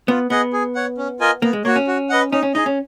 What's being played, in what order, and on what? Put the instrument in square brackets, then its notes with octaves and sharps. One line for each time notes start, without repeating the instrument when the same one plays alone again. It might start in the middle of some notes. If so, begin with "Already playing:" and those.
[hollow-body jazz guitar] B3 [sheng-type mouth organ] F4
[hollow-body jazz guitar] B3 [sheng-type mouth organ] G#4 D#5 F#5
[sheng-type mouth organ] G#4
C#5 F#5
C#4
F4 A#4 D#5 G#5
[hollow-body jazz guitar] A#3 [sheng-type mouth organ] B3
[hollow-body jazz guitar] G#3
[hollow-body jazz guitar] A#3 [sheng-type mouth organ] F#4 C#5
[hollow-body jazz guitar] C#4
[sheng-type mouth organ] F#4
B4 D#5 F#5
[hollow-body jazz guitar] C#4 [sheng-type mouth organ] D#4
[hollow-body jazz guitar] C#4
[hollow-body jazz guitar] D#4 [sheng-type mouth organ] G#4 D#5
[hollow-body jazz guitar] C#4